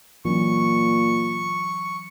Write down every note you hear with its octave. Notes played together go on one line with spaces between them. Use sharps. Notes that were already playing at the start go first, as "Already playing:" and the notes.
A#2 E3 F#3 C#4 C#6